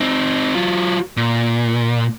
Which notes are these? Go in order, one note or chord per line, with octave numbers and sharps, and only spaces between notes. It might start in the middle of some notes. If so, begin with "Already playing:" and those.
C4 D#4
F#3 F4
A#2